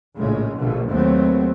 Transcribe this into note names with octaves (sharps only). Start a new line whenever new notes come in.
A#1 A2 C#3 G#3
A#1 B2 D3 A3
D#2 F#3 A3 B3 C4